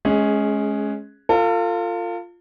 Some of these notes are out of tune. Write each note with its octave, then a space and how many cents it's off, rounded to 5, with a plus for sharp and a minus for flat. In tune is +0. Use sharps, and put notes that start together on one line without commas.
G#3 +25 C#4 +0 G#4 +0
F4 +0 A4 +40